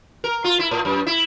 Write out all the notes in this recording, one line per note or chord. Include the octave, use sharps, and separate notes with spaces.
A#4
F4
E4
A2
F#2
E4